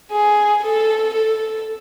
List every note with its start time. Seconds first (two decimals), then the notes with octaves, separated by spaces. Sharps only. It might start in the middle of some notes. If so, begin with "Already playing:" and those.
0.11 G#4
0.63 A4
1.14 A4